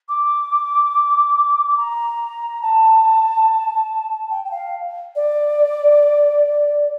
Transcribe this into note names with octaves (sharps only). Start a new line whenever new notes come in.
D6
A#5
A5
G5
G5
F5
D5